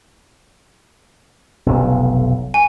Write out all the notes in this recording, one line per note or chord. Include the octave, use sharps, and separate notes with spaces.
F1 B1
G#5